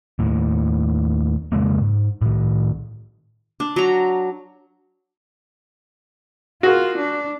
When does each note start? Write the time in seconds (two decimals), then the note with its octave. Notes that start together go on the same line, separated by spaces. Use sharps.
0.19 D#2 A2
1.52 F2 C#3 G#3 A#3
1.81 G#2
2.22 A2 D#3
3.60 D4
3.76 F#3 A#5
6.63 F4 F#4 G#4 A#4
6.98 D4